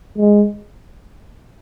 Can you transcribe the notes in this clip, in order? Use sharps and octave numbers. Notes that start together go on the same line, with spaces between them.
G#3